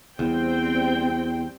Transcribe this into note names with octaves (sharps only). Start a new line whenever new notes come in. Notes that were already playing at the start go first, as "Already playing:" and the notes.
E2 G3 C4 G5